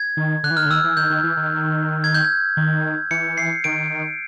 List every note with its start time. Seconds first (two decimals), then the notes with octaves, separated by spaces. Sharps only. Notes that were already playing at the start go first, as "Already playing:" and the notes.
Already playing: G#6
0.17 D#3
0.44 D3 F#6
0.51 E3
0.57 D#3 F6
0.66 D3
0.70 D#3 E6
0.84 E3
0.97 D#3 G6
1.10 D#3
1.23 E3
1.37 D#3
2.04 G#6
2.14 G6
2.25 G#6
2.57 D#3
3.11 E3 C#7
3.38 C7
3.64 D#3 D7